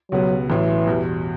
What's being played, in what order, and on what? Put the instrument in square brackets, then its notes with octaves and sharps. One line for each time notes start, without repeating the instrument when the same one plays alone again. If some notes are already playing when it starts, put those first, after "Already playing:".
[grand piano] C#2 B2 G3 B3 F#4 [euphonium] F#3
[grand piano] A1 A2 F#3 [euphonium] E3
[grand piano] E2 B2 G3